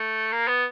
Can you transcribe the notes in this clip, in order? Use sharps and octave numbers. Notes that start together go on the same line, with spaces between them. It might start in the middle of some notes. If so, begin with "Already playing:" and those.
Already playing: A3
A#3
B3